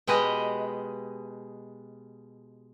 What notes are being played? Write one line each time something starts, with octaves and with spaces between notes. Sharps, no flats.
B2 G#3 G4 B4 D#5